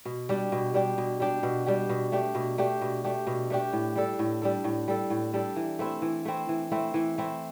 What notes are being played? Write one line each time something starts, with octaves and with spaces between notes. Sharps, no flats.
B2
G3 D4 G4
B2
G3 D4 G4
B2
G3 D4 G4
B2
G3 D4 G4
B2
A3 D4 G4
B2
A3 D4 G4
B2
A3 D4 G4
B2
A3 D4 G4
A2
G3 D4 A4
A2
G3 D4 A4
A2
G3 D4 A4
A2
G3 D4 A4
E3
A3 C4 E4
E3
A3 C4 E4
E3
A3 C4 E4
E3
A3 C4 E4